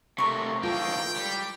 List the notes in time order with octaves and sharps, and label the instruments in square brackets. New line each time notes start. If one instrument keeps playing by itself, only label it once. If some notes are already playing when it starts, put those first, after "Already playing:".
[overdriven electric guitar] C3 A3 [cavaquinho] A#4 C#6
[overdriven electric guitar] E3 A#3 [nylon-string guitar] F4 A4 [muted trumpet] G5
[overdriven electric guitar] G3